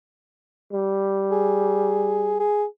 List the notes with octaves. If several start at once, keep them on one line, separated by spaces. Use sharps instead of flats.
G3
G#4
G#4